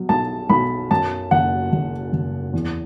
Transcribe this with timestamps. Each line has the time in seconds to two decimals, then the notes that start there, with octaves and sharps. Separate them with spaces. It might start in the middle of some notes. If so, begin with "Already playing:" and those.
Already playing: B2 F#3
0.09 B1 A5
0.50 B1 B5
0.91 F#2 A5
1.31 F#1 F#5
1.72 F#1
2.13 F#1
2.53 E2